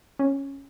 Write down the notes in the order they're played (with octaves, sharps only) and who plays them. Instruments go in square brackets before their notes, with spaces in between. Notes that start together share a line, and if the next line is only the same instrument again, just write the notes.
[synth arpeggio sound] C#4